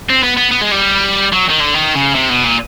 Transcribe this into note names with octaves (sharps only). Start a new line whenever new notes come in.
C4
B3
B3
B3
G#3
G3
F#3
D#3
D3
D#3
C#3
C3
B2
A#2